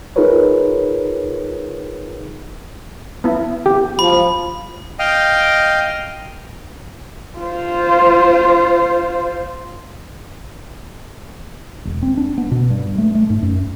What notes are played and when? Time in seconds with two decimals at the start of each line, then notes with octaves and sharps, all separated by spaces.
0.16 D#4 F4 G#4 A#4 B4 C#5
3.24 B3 E4
3.66 G4
3.99 F3 B5
4.99 D#5 F5 G5
7.39 F4 C5
11.85 E1
12.02 C4
12.17 D4
12.38 B3
12.51 B2
12.70 G2
12.98 A3
13.15 A3
13.30 G#2
13.43 F#2